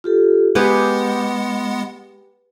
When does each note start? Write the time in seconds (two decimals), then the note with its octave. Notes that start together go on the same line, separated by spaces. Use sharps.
0.04 F4 G4 A4
0.55 G#3 B3 G4 G#4 B4 F#5 B5